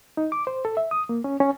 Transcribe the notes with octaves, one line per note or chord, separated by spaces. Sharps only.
D#4
D6
C5
A4
E5
D#6
A#3
C#4
C#4